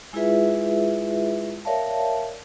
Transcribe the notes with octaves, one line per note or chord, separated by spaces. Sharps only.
G#3 E4 F4 G#4 B4 E5
A#4 C#5 D5 E5 F5 A5